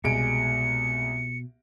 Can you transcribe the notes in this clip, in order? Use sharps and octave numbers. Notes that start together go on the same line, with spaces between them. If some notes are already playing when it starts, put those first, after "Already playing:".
C2 B2 G#3 C#7 D7